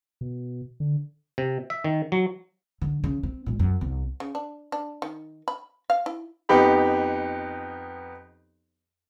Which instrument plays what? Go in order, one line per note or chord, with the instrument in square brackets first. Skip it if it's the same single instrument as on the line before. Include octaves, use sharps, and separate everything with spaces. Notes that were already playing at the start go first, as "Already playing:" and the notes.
[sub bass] B2
D3
[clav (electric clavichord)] C3
E5
D#3
F#3
[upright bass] D3
C#3
C4
A#2 G#3
F#2
C2
[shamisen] C#3
D4
D4
D#3
B5
F5
E4
[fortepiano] F2 B3 D#4 G4 G5 B5